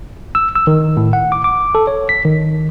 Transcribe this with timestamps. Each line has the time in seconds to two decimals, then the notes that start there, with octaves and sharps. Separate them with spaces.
0.35 E6
0.55 E6
0.67 D#3
0.97 A2
1.13 F#5
1.32 D6
1.44 D6
1.75 A4
1.87 C#5
2.09 B6
2.25 D#3